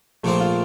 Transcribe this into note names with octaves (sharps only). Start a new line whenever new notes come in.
A#1 A#2 F3 A3 C4
F4